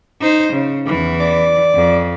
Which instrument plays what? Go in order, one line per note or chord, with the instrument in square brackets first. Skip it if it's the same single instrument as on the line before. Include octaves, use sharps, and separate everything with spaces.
[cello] D#4 C5
C#3
E2 E3
[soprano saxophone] D5
[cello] F2